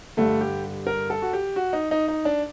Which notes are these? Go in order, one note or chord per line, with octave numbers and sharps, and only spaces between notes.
G2 D3 G3 A3
G4
A#4
A4
F#4
G4
F#4
D#4
D#4
D#4
D4